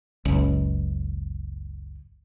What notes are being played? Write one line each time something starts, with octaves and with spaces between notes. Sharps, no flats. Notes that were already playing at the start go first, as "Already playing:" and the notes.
F#1 C#2